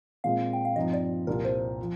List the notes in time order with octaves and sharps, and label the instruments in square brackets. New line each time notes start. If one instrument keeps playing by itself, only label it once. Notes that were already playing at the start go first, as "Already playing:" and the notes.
[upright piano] A#2 G#3 C4 F4 [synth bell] F5
[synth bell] G5
F5
[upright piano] G2 F3 C4 D#4 [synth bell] D#5
[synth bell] D5
[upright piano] C2 A#2 G3 D4 F4 [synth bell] A#4
[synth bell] C5
[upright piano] F3